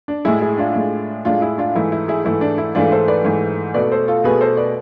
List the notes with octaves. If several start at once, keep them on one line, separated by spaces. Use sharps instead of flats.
D4
A2 G#3 E4 G#4
E4 G#4
D4 F4
A2 G#3
A2 G#3 D4 F4
E4 G#4
D4 F4
G#2 E3 A3 E4
E4
E4 G#4
G#2 E3 A3 E4
D4
E4
G#2 E3 A3 D4 F4
A4 C5
B4 D5
G#2 E3 A3
B2 A3 B4 D5
A4 C5
F4 A4
B2 A3 G#4 B4
A4 C5
B4 D5